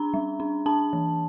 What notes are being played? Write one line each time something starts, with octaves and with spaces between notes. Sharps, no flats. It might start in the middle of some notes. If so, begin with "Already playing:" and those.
Already playing: D4 A#5
G3
D4
D4 A5
E3